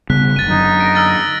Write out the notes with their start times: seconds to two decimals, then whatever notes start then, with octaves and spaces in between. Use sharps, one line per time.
0.10 C#3 G3 B3 F#6 B6
0.36 F#1 C#3 A6 D#7
0.49 F#2 D3 D#4
0.80 A#6 D7
0.95 E6 F6 A6